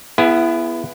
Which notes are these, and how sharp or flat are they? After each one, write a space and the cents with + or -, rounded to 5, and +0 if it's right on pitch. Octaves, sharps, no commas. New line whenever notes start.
B3 -10 E4 +20 G#4 +0